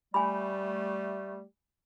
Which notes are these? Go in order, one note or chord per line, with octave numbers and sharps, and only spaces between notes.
G3 A3 G#5 B5